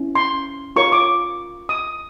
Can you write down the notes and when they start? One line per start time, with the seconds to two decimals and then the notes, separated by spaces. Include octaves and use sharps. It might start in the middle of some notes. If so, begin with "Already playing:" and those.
Already playing: C#4 E4
0.15 C6
0.76 F4 A#4 C#5 C#6
0.92 D6
1.69 D#6